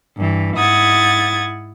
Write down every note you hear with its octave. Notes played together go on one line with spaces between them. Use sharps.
G2 E3
G#2 E4 F#5 D#6 G#6 A6